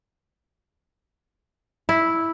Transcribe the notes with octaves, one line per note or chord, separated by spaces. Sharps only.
E4